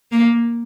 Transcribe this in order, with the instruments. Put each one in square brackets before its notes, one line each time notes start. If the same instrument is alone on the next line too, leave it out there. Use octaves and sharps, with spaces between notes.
[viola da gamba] A#3